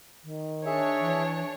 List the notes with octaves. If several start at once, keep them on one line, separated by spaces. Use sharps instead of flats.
D#3
D4 G#4 C#5 E5
E3